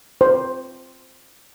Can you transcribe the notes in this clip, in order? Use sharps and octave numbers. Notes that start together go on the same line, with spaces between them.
C5